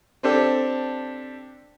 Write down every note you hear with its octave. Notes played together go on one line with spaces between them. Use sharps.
C4 D4 G4 A4